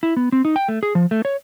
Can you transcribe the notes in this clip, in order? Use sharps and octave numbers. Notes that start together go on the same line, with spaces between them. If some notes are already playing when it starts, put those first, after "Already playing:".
E4
B3
C4
D#4
G5
A3
G#4
F3
A3
C#5